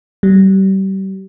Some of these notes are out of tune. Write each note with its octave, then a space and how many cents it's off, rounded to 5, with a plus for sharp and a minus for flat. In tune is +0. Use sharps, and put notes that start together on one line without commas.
G3 -30